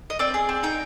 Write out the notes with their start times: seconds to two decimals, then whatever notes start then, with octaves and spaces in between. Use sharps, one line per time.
0.10 D#5
0.19 C4 D5
0.34 G#4
0.49 C4
0.63 D#4 G5